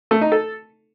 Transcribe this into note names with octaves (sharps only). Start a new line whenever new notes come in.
A3
D#4
A4